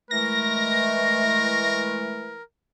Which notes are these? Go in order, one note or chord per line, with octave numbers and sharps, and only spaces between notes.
E3 G#3 A3 A#4 A#6